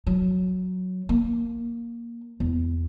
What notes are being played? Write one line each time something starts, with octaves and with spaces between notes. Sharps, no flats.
F#3
A#3
E2